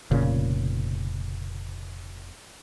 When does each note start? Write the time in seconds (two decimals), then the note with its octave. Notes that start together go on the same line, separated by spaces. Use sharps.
0.11 F1 A#2 C#3